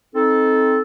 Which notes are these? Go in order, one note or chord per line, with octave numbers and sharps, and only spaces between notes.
C4 D#4 A4